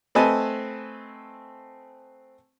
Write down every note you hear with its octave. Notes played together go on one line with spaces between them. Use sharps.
A3 C4 B4 D#5 G#5 A5